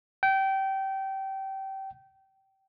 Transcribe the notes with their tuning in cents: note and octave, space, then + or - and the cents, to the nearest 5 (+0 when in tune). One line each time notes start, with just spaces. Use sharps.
G5 -25